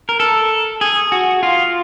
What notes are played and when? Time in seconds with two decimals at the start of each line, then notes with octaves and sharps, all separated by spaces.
0.09 A#4
0.20 A4
0.81 G#4
1.12 F#4
1.43 F4